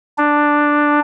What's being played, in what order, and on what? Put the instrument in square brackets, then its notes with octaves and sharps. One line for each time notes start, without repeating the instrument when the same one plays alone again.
[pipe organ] D4